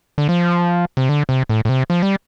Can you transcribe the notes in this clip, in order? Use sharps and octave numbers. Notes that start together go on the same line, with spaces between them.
D3
F3
C3
D3
C3
A2
A2
C3
F3
G3